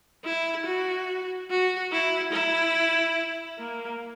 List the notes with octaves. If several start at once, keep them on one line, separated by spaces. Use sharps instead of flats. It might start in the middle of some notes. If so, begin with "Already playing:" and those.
E4
F#4
F#4
E4
E4
A#3